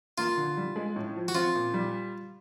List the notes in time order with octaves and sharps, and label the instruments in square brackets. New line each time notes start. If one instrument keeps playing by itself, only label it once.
[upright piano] A#3 [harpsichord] F4
[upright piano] D3
G3
G#3
A2
F3
[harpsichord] F#4
[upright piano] C4 [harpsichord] F4
[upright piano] A#2
G3